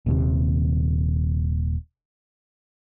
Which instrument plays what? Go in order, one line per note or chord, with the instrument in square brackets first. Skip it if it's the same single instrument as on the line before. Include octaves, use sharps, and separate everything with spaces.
[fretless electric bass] D#1 D#2 C3